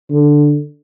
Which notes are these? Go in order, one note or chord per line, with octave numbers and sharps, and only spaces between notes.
D3